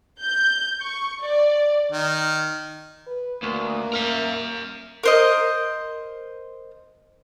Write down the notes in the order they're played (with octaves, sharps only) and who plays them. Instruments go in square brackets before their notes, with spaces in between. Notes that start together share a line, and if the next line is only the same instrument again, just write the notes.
[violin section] G6
C#6
D5
[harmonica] D#3
[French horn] B4
[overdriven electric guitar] D2 [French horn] A#3
[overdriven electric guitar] A#4 E5
[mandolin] A#4 C5 D#5